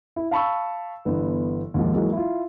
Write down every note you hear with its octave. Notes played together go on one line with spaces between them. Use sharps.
E4
F5 A5 B5 C#6 E6
G1 E3 B3
D#2 G#2 F3
E3 F#3 G#3 A#3
E4 F4